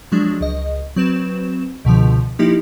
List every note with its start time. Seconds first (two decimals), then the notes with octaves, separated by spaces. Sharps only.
0.12 F3 F#3 G#3 D4
0.41 C#2 D#5
0.96 F#3 C4 B4 E7
1.85 C#2 B2 D3 F3
2.39 F3 A#3 D#4 E4 G4